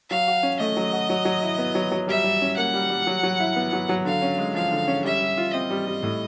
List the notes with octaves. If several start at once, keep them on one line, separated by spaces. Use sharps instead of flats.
F#3 F5
F#4
C#4
A3 D#5
F#3
F#4
F#3
F#3
E4
B3
F#3
F#3
G3 E5
G3
C#4
A#3 F#5
G3
G3
F#3
F#3
E4
B3
F#3
F#3
D3 F5
C#4
G#3
F3 F5
D3
C#4
G3 E5
G3
F4
C4 D#5
G3
G3
A2